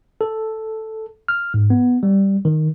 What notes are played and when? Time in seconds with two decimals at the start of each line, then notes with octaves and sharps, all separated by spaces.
0.21 A4
1.28 F6
1.54 G#2
1.70 B3
2.03 G3
2.45 D#3